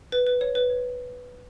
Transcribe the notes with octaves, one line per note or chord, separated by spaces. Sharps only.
B4
B4
C#5
B4
C#5